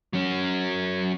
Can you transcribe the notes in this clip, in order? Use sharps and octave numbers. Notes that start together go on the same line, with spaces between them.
F#3 C#4